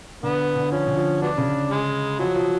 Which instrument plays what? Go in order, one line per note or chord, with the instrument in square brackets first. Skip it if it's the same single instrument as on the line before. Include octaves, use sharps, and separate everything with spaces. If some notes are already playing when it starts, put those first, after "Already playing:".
[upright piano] D3 [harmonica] B3
[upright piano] D3
[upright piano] F3 [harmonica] C#4
[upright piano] D3
F3
[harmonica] F#3 B3 D4
[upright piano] C#3
[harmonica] G#3
[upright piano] F3 [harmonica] F#3
[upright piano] F3